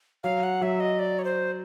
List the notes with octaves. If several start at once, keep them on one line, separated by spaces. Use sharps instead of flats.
F#3 F5
F#5
F#3 E5
D#5
D5
C#5
C5